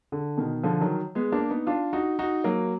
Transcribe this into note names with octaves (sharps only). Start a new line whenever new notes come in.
D3
B2 D#3
D3 F3
D#3 F#3
G#3 B3
A#3 D4
B3 D#4
D4 F4
D#4 F#4
D#4 F#4
F#3 A#3